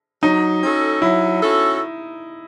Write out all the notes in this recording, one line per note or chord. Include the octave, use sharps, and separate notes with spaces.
F#3 D#4
C#4 F#4 A4
F#3 E4
C#4 F#4 A4